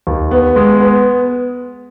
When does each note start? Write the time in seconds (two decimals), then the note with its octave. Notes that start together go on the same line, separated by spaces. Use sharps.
0.07 D#2
0.31 B3
0.56 G#3
0.80 B3